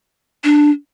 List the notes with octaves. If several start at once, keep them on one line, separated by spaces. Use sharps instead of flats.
D4